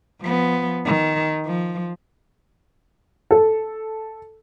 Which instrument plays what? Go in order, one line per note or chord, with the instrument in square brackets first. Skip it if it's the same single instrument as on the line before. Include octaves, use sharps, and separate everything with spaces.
[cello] F3 B3
D#3
F3
[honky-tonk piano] A4